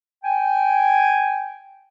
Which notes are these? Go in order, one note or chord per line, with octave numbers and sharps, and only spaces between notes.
G5 G#5